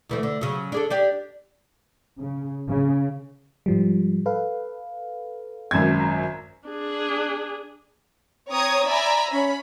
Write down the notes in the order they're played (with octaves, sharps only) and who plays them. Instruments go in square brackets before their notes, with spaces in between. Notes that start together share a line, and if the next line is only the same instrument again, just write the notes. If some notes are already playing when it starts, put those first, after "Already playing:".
[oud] D2 E3 A3
D3
C#3 F#3
D4 G#4 A4
D4 G4 D5
[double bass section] C#3
C#3
[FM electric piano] G#2 F3 G3
A4 B4 F5
[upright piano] G#1 F#2 G#6
[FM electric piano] A#5
[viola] D4 G#4
[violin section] C4 C#5 A#5 D#6 G#6
D5 E5 G#5 A#5 B5
C#4 B5